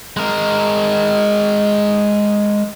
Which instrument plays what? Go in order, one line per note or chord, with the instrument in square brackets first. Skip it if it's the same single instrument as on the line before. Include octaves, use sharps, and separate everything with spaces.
[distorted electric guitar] G#3 A#4